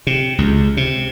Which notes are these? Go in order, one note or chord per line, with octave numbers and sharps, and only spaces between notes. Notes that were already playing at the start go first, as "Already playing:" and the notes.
C3
C#2
C3